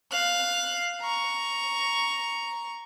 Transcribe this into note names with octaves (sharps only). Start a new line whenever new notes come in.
F5 F#6
A#5 C#6